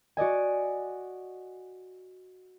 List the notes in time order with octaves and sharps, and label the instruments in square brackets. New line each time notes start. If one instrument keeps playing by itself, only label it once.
[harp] F#4 D5 D#5 G#5